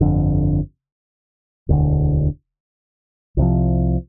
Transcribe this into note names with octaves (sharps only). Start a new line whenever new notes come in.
G1 F2 D3
E1 D2 D3
C2 C3 F3